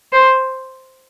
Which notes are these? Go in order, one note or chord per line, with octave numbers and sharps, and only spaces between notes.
C5